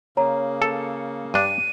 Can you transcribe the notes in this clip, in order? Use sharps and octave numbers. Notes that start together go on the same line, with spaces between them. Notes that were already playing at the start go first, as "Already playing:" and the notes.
C#3 A#3 C#5 A#5
A4
G2 D4 D#7